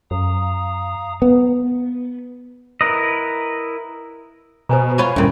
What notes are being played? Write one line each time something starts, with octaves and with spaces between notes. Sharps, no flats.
F#2 F5 A#5 D#6
B3
E4 A#4 B4 D#5
B2 C5 G#5 A#5
F4 B4 C#5
D2 G2 A#2 C#4 E4